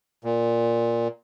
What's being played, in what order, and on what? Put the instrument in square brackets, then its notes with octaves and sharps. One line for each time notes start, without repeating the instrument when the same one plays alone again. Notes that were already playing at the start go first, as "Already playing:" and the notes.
[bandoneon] A#2